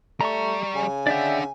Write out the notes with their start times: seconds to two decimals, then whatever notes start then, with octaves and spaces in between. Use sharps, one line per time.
0.21 G3 A3 D5 A#5 C#6
0.74 C#3 G#5
1.07 D4 D5 E5 F#5 G5